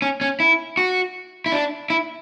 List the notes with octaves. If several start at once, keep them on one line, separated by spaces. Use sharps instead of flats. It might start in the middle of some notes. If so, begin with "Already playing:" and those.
C#4
C#4
E4
F#4
E4
D4
E4